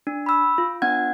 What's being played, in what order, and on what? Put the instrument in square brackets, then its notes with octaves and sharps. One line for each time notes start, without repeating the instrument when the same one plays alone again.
[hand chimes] D4
B5 E6
F4
B3 D4 F#5 G#6